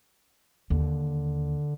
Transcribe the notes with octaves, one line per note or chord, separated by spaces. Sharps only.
D#2 D3